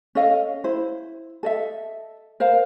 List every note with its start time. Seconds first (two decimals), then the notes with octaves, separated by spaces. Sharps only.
0.15 C#4 A4 D#5 F5
0.64 E4 C5
1.43 A4 D#5 E5
2.40 A#4 C5 F5